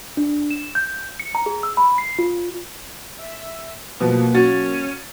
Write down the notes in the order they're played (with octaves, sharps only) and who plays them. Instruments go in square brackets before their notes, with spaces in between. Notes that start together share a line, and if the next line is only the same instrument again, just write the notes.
[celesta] D4
E7
G6
C#7
A#5
G#4
E6
B5
C7
F4
[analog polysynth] E5
[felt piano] B2 F3 [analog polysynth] F#3 A#3 [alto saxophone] B4
[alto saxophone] C#4 [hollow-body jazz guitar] F#4 [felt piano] A6